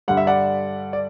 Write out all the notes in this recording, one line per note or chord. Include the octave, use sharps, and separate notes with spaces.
G2 D3 G3 F#5
E5
D5 F#5
D5